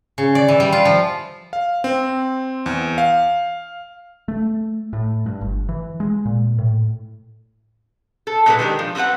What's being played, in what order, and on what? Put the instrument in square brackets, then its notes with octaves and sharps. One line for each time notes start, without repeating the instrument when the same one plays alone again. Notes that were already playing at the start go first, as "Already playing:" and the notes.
[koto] C#3
D5
E3
G3
F4
F3
[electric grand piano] F5
C4
E2
F5
[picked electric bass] A3
A2
G2
G1
E3
G#3
A#2
A2
[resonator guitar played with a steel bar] A4
A#2 F#3 G#3 F#4 A4 B4
D#3 G#3 D4 G4 A#4
F3
G3 C4 F4 B4 F#5